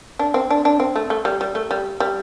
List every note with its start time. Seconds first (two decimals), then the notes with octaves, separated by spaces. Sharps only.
0.19 D4
0.34 C4
0.50 D4
0.65 D4
0.80 C4
0.96 A3
1.10 A3
1.25 G3
1.41 G3
1.55 A3
1.71 G3
2.00 G3